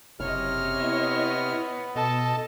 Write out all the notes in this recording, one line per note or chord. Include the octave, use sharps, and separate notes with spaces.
F#1 C3 C#5 D#5 F6
B3 E4
B2 A4 D#5 A5